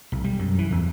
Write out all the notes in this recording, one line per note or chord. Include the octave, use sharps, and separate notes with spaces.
B1
G3
F#2
E3
E2